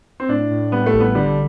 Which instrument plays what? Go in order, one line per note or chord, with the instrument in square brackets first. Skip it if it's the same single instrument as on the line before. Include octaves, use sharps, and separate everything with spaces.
[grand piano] C4
[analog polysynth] A2 [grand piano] D4
[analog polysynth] A2
[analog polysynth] G3 [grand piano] B3
[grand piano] A3
[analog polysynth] A1
[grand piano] B3
[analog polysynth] D3 [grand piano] G3